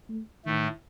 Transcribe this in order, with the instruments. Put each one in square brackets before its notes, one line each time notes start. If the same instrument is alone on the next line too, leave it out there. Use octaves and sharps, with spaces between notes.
[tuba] A3
[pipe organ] A2 A3 [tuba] D#3